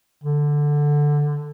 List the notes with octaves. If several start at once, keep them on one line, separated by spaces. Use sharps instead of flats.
D3